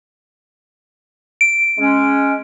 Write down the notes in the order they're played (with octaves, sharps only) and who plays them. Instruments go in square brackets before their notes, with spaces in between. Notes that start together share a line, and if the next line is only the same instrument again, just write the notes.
[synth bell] D7
[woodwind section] G#3 C#4